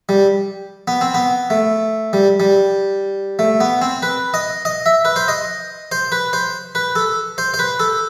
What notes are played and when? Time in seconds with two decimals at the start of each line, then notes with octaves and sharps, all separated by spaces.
0.09 G3
0.88 B3
1.01 C4
1.14 B3
1.50 A3
2.13 G3
2.40 G3
3.39 A3
3.60 B3
3.82 C4
4.03 B4
4.34 D#5
4.65 D#5
4.86 E5
5.05 B4
5.16 C5
5.28 D#5
5.92 C5
6.12 B4
6.33 C5
6.75 B4
6.95 A4
7.38 C5
7.54 C5
7.59 B4
7.80 A4